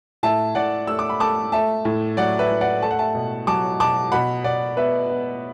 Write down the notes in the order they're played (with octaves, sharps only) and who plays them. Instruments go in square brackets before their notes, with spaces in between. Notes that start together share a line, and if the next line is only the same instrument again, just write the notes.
[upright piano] A2 E5 A5
A2 D5 F#5
A3 E6
D6
B5
A3 A5 D6
A3 E5 A5
A2
F#3 D5 F#5
B4 E5
A2
D5 F#5
A3 A5
F#5
E5 A5
B2
F#3 A5 D6
B2 A5 D6
B2 F#5 B5
B2 D5 F#5
B3 B4 E5
B3